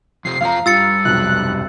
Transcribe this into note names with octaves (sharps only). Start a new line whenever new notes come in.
F2 C3 G4 C7
F2 D3 F3 F5 A#5
G2 G3 F4 E6 A6 C#7
F1 B1 F#6